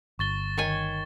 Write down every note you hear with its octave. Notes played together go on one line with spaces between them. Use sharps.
G1 C#6 A6 G7
D#3 C#5 G#5